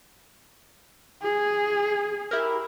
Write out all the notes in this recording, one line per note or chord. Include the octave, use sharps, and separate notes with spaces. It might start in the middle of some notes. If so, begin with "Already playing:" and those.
G#4
E4 G4 A#4